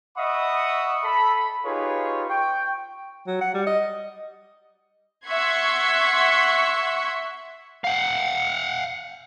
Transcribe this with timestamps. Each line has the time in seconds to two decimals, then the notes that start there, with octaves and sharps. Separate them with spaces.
0.17 D#5 E5 F#5 B5 C#6 D#6
1.04 A4 B5
1.65 D#4 F4 G4 G#4 B4 C#5
2.30 G5 C#6
3.27 F#3
3.41 F#5
3.54 G3
3.67 D#5
5.28 E5 F#5 C6 C#6 G#6 B6
7.84 F5 F#5